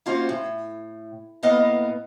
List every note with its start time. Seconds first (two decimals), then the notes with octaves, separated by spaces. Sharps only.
0.06 A#3 C#4 F4 F#4 C5 F5
0.29 A2
1.43 A2 A#3 B3 B4 D#5 F5